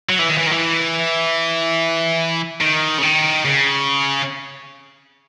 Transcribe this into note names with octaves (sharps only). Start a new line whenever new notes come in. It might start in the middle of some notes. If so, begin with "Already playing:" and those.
F#3
E3
D#3
E3
D#3
E3
D#3
C#3
D#3
C#3